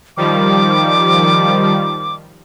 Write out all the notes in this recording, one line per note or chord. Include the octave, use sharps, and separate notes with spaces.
D#3 F3 G3 D6